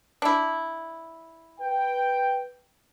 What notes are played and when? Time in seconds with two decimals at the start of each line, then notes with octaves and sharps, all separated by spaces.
0.22 D4 E4
1.60 B4 G5